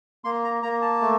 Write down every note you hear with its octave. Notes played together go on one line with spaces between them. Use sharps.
A#3 C6
A#5
A#3 A#5
A5
A3